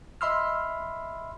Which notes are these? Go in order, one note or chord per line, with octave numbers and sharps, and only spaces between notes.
D#5 E5 B5 C6 E6 F6